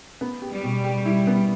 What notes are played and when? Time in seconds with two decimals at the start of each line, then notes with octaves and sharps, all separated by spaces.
0.21 B3
0.42 G4
0.52 G3
0.63 B2
0.84 G4
1.05 E4
1.27 B3